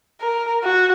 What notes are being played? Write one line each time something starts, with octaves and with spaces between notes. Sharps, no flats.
A#4
F#4